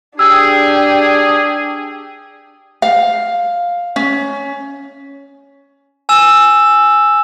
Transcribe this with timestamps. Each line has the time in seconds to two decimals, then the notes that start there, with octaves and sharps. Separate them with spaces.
0.19 D4 G4 G#4 G5 E6
2.82 F5
3.96 C#4
6.09 G#5 E6 E7